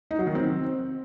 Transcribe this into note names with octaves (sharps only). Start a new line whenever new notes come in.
D#4
F#3
D#3
C4